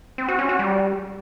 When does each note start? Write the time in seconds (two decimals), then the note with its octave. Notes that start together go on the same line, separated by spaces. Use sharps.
0.18 C4
0.28 F#4
0.39 C#4
0.49 F#4
0.59 G3